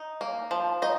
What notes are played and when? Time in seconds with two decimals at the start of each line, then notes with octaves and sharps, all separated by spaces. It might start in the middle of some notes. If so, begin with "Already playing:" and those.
Already playing: D#4
0.21 A#3
0.51 F3
0.82 D#4 D#5